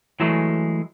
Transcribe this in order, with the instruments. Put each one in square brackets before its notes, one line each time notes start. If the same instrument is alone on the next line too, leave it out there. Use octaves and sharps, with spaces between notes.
[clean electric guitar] E3 F#3 G#3 A3